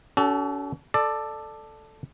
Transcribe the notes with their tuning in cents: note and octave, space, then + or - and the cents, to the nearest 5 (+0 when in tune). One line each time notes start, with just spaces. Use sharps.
C#4 +40 F#4 +45 A4 +0
A4 +0 D5 +15